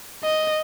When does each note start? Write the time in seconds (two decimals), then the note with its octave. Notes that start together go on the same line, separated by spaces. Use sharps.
0.24 D#5